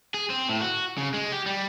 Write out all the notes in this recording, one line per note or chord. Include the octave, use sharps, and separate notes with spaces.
G#4
C4
A2
F#4
C#3
G#3
G4
G3